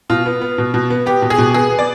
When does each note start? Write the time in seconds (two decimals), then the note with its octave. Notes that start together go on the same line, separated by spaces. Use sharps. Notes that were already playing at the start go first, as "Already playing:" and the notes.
0.10 B2 F4
0.26 B3
0.41 B3
0.58 B2
0.74 B2
0.90 B3
1.06 B3 G4
1.22 B2
1.30 G#4
1.38 B2
1.54 B3 G#4
1.70 B3
1.79 D5